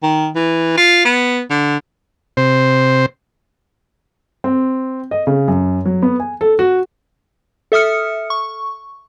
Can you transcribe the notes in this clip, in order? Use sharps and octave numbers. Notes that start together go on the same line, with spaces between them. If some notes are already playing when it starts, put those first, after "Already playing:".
D#3
E3
F4
B3
D3
C3 C5
C4
D#5
C#3
F#2
F#3
B3
G#5
A4
F#4
A4 E5 D#6 F6 C#7
C#6